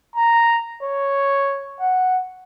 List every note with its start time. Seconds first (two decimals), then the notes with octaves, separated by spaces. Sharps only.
0.16 A#5
0.83 C#5
1.80 F#5